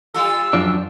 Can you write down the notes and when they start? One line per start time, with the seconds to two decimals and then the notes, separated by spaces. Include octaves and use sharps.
0.14 G3 F4 A4 E6
0.53 F#2 F3 D4